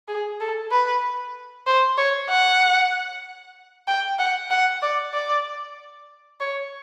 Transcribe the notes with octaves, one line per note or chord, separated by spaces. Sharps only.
G#4
A4
B4
C5
C#5
F#5
G5
F#5
F#5
D5
D5
C#5